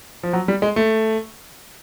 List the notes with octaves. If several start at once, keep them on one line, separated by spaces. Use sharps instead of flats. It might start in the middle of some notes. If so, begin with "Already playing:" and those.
F3
F#3
G3
G#3
A3